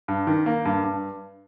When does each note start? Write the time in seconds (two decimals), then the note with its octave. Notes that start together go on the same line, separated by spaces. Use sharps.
0.08 G2
0.27 D#3
0.46 A#3
0.65 G2
0.84 G2